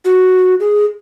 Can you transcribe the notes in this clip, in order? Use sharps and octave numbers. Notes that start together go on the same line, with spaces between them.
F#4
G#4